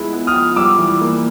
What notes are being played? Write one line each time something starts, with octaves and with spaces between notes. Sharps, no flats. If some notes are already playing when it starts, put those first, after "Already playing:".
Already playing: F3 G#3 B3 E4
B3
D#6 F6
F3
G3 D6 E6
E3
A#3